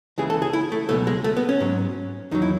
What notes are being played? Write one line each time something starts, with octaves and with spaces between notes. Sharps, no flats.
C#2 C#3 E3 G#4
A4
G#4
E4
A3
C#2 B2 F#3 A3
G#3
A3
B3
C#4
G#2 F#3
E2 D#3 F#3 D#4
E4